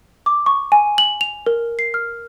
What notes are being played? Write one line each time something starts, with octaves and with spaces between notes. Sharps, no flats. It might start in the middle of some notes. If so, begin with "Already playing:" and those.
D6
C#6
G#5
F#7
F7
A#4
C7
F6